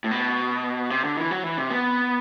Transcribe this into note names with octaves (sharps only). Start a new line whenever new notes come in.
A2
B2
C3
D3
E3
F#3
E3
C3
B3